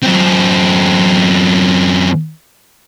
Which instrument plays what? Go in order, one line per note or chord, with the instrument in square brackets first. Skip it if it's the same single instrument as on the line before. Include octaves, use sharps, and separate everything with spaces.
[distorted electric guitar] F#2 C4